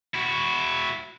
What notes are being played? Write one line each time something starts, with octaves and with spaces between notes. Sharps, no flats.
E4 F#4